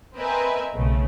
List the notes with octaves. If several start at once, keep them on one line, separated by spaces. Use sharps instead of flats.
C4 A#4 B4 D#5 E5 G#5
B1 C#3 A3